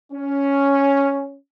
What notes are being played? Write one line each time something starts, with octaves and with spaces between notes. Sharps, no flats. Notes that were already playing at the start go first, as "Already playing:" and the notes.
C#4